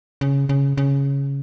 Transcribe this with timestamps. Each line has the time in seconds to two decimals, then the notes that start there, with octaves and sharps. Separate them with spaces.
0.21 C#3
0.49 C#3
0.77 C#3